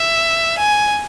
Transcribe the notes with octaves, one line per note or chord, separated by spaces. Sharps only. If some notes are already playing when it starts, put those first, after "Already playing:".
Already playing: E5
G#5